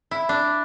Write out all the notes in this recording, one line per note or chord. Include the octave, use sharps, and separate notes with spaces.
E4
D4